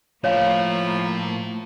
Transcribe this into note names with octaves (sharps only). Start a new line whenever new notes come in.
A2 F3 A3 A#3 C#5 F5